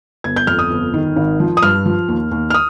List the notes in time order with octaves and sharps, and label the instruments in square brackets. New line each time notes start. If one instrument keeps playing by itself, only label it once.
[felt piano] G1 G#6
G6
F2 F6
D#6
G1
D#3
G#1
F3
D#6
G2 F6
F3
D#2
D#2
F6
D#6